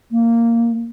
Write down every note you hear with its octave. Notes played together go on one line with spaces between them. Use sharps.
A#3